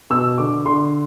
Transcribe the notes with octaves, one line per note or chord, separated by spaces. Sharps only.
B2 E6
D3 D6
D3 C6